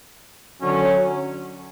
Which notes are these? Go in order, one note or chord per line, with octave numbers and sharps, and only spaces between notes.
D3 F#3 C#4